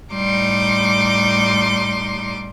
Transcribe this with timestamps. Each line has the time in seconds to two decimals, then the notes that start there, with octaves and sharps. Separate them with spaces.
0.12 A2 G3 D#4 C6 D6